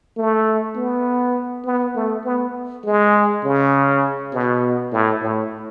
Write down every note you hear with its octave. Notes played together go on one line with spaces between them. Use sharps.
A3
B3
B3
A3
B3
G#3
C#3
B2
A2
A2